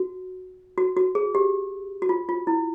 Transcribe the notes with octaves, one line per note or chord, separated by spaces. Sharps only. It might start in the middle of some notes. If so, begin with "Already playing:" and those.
Already playing: F#4
F#4
F#4
G#4
G4
F#4
F4
F4
E4